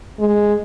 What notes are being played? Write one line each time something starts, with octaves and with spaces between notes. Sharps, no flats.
G#3